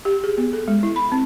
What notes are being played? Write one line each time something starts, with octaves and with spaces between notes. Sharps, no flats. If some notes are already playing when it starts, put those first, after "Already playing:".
G4
G#4
B3
A4
G#3
E4
B5
C4